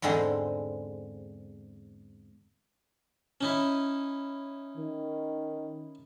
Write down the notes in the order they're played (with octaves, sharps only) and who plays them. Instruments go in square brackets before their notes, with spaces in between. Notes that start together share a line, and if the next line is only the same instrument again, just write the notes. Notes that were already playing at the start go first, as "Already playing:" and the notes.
[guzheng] E2 G#2 D3 G#3 C4 A#5
[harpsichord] C#4 D#4 E4
[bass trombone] D#3